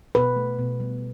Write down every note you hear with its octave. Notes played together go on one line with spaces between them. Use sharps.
B2 B4
A3
B2
G3